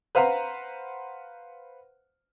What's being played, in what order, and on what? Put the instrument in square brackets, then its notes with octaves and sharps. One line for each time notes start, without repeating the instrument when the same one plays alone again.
[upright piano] B4 C5 F5 F#5 A#5